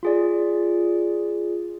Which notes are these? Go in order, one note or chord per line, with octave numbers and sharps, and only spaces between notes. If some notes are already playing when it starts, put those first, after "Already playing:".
F4 G#4 D5